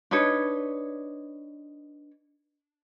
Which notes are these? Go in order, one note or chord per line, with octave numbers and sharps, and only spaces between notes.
D4 D#4 B4 C#5